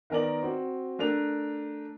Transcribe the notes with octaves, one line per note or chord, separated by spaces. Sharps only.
D#3 B3 A#4 D5 F#7
C4 F#4
A3 D4 A#4 F7